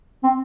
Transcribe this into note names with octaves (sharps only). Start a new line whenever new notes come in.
C4